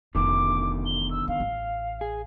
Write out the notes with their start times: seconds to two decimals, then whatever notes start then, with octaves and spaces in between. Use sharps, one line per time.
0.15 F1 B2 D3 D#3 D4 D6
0.85 G7
1.10 E6
1.28 C#4 F5
1.40 A1
2.01 G#4